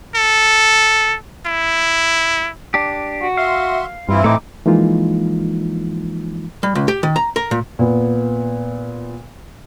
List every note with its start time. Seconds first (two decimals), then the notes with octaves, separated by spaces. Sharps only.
0.15 A4
1.46 E4
2.74 D4 G4
3.22 F#4
3.37 E5 F5 C6
4.09 G2 E3 C4 E4 F4
4.24 A2 A3 D#4 D6
4.66 E3 F3 G#3 A#3 D#4 F4
6.63 G3
6.75 C#2
6.88 G4
7.03 D#3
7.16 A#5
7.36 A#4
7.51 A#2
7.79 A#2 B3